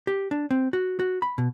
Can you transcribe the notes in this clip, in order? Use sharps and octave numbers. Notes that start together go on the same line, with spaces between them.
G4
D4
C4
F#4
F#4
B5
B2